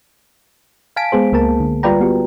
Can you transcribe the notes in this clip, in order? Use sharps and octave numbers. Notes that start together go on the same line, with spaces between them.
F5 G#5 A5 B6 D7
G#3 B3 G#4 C5
C#2 A#3 A#4 A5
D3
G3 F4 B4 D5 G5 A#5
B3 F#4 G4